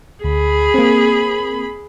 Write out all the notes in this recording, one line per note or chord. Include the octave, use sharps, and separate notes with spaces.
D2 G#4 B5
A#3 C4